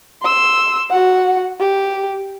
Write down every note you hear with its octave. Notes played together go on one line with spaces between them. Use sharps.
C6 E6
F#4 F#5
G4